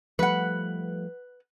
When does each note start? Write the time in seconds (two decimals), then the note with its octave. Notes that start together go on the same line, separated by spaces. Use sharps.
0.19 F3 G3 A3 B4 F#5